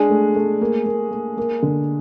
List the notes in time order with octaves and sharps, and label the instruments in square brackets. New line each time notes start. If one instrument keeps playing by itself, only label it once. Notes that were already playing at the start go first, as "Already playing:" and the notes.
Already playing: [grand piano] G#3 G#4 [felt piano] D4
[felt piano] A3
A3
A#3
A#3
A#3
A#3
D3